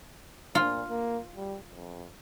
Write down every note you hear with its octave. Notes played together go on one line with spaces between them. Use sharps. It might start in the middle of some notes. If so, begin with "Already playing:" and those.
A#2 F4
A#3
G3
F2